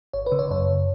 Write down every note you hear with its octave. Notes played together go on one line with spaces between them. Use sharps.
G#1 C#5
B4
C#3
C#5
F#2 C#5